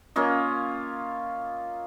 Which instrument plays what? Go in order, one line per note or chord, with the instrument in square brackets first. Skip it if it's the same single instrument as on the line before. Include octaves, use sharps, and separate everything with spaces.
[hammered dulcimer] A#3 C#4 F4 D#5